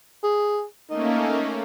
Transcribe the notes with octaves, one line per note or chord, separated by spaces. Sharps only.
G#4
A3 A#3 C#4 D#4